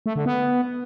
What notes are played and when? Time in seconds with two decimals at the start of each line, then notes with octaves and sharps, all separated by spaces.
0.06 A3
0.16 D3
0.26 B3